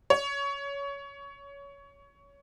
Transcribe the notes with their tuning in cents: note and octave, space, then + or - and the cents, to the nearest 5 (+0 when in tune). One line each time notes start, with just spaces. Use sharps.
C#5 +20